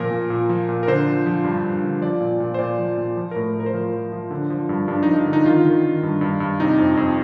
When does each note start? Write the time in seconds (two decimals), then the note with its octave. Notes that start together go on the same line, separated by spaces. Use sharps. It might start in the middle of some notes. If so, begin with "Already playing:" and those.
Already playing: A#2 F3 A#4
0.11 A#2
0.30 A#2
0.49 F3
0.69 A#2
0.83 A#4
0.87 D3 C5
1.07 F3
1.26 F3
1.44 G2
1.64 G2
1.83 D3
2.02 F3 D5
2.21 A#2
2.40 A#2
2.54 C5
2.59 A#2 D5
2.79 F3
2.97 A#2
3.17 F3
3.31 A2 A#4
3.55 A2 A#4
3.66 C5
3.74 F3 A#4
3.93 F3
4.12 F3
4.31 D3
4.50 F3
4.69 G2
4.88 G2 D4
5.03 F3 D#4
5.17 D#4
5.26 D3
5.33 D#4
5.45 D#3 F4
5.65 D#3
5.83 D#3
6.03 G2
6.21 G2
6.40 G2
6.60 C3 D#4
6.78 F2
6.97 F2